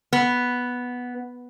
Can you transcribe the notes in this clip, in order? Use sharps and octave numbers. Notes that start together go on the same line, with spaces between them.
B3